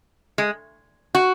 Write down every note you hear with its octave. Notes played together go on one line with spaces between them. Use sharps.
G#3
F#4